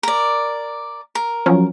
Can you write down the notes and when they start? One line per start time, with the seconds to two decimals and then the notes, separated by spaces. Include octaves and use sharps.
0.03 A#4 D5
1.15 A#4
1.46 F3 F#3 C#4